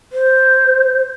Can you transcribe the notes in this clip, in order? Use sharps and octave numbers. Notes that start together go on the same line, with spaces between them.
C5